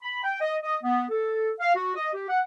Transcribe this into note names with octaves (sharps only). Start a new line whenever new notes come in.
B5
G5
D#5
D#5
B3
A4
F5
F#4
D#5
G4
F#5